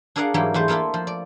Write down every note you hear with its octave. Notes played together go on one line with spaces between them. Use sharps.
D4 G#4 A#4 D5 F5 F#5
G#2 E3 F#3 G3 A#3
E2 A3 C5 A5
A3 A#3 E4 F4 A4
F3
D5